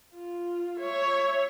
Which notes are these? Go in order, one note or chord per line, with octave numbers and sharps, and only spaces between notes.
F4
C#5 E5